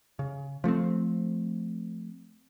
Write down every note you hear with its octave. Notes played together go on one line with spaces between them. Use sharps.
C#3
F3 A3 B3 C4